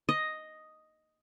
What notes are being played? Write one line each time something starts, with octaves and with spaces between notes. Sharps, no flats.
D#5